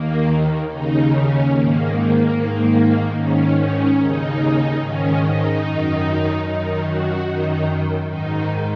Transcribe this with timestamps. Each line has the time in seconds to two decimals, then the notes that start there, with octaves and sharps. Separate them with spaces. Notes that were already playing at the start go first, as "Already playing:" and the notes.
Already playing: D#2 D#3 A#3
0.70 D#2 C#3 D#4
1.12 C#4
1.52 G#2 D#3 A#3
1.93 A#3
2.34 G#2 D#3
3.16 G#2 D#3 C#4
3.58 C#4
3.98 D#2 C#3 D#4
4.80 G#2 D#3 C#4
5.21 D#4
5.63 F#2 D#3
6.44 F#2 D#3 D#4
6.85 F#4
7.27 F#2 D#3 D#4
8.09 G#2 D#3 D#4